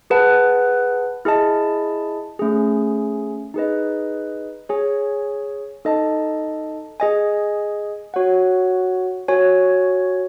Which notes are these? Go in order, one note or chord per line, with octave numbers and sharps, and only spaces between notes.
G#4 B4 F#5 A5
E4 G#4 D#5 A5
A3 C#4 G#4
D#4 G#4 B4 D#5
G#4 C#5 G#5
D#4 A4 D#5 A5
G#4 D#5 G#5
F#4 C#5 F#5
F#4 C#5 G#5